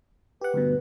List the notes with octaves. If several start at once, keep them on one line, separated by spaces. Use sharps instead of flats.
G4 B4 F#5
D2 G2 B2